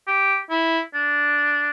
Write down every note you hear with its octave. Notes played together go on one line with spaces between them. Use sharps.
G4
E4
D4